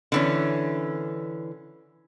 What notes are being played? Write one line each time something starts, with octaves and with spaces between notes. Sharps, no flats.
D3 E3 C#4